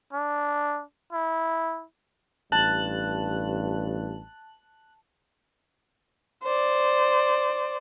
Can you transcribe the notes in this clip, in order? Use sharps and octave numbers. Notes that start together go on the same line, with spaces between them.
D4
E4
A1 G2 A5 F#6
C5 D5